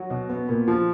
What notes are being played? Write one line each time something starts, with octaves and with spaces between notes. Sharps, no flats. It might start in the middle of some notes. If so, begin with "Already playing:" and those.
Already playing: F#3
B2
B3
A#2
F3